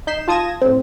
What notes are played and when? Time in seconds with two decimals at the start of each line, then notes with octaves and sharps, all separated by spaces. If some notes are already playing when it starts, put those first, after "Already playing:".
0.07 D#4 G6 B6 C7 E7
0.28 F4 A5 D#6 G#6 A#6 E7
0.62 A2 C4